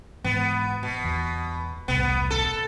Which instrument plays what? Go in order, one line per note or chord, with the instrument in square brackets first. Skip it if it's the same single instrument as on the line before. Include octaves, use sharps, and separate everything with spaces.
[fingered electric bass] G#2 E3 [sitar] B3
[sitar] B2
[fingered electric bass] E2
[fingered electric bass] E1 C2 A2 [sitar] B3
[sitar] A4